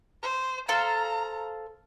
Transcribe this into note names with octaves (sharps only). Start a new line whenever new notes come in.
C5
A4 C5 F5 A#5